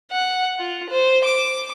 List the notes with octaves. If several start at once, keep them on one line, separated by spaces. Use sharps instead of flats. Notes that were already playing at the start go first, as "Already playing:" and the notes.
F#5
F4
C5
D6